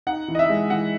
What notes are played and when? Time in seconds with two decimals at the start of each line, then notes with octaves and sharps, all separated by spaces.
0.07 D#4 F#5
0.28 E3
0.35 D#5
0.39 E5
0.49 G#3
0.70 E3 F#5